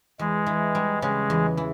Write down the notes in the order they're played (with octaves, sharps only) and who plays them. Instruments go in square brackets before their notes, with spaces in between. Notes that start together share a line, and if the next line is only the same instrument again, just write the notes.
[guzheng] E2 [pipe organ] G#3
[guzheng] E3
G3
[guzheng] C#3 [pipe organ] G#3
[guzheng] E2
E3